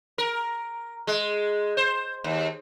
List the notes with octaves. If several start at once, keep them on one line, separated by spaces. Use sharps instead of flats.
A#4
G#3
C5
D#2